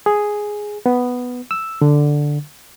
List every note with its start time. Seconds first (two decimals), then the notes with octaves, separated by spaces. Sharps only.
0.06 G#4
0.86 B3
1.51 E6
1.82 D3